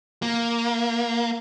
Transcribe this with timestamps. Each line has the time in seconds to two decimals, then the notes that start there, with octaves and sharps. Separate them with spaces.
0.22 A#3